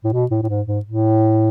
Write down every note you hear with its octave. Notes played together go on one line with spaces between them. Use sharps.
A2
B2
A2
A2
G#2
G#2
A2